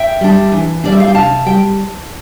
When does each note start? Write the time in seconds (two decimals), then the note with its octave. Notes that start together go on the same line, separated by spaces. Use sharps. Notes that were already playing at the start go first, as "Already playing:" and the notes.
Already playing: E5 G5
0.21 G3 D4
0.52 E3
0.84 G3 D4 D5
0.92 E5
1.00 F5
1.08 G5
1.14 C3 F5 A5
1.46 G3 G5